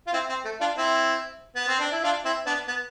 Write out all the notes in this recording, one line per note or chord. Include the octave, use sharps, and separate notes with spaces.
F4
C4 E4
C4
A3
D4 F4
C4 E4
B3
C4
D4
E4
D4 F4
C4 E4
B3 D4
B3